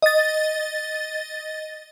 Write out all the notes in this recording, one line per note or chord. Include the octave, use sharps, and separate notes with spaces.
D#5 A6